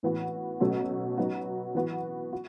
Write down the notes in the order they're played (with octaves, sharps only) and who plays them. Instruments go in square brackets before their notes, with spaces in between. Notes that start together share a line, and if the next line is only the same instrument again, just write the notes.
[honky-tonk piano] A2 E3 B3 F#4
B2 F#3 A3 C#4 F#4
F#3 B3 D#4 F#4
E3 B3 F#4
F#4